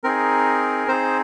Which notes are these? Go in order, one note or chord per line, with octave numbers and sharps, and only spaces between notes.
C4 D#4 G#4 A#4
C4 D#4 G#4 C5